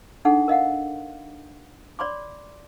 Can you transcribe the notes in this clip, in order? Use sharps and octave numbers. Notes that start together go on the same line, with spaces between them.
D4 D#4 G#4 A4 F#5
A#4 D#5 F5 F#5
C#5 D5 B5 C6 D6